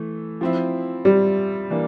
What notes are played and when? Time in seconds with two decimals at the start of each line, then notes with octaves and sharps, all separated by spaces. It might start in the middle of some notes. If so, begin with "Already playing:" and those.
Already playing: E3 A3
0.41 F3 C4 E4
1.05 G3
1.70 E3 A#3 D4